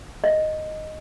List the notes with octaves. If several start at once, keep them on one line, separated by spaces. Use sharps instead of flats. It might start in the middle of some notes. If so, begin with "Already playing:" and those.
D#5